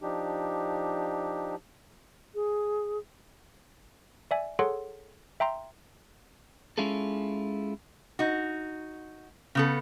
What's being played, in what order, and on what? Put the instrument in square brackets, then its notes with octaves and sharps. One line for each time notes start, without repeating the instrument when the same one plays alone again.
[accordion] F3 D4 D#4 G4
[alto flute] G#4
[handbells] D5 E5 G#5
G#4 A4 C#5 F#5 C6
E5 G5 A#5 C6
[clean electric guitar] G#3 C#4 E4 F4 G#4 A4
[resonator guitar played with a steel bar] D#4 F#4
C#3 B3 A4